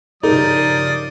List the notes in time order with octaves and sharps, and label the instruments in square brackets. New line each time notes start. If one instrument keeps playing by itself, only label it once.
[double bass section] G2 C#3 [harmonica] F3 D5 D#6 [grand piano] D#4 [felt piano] G4 A#4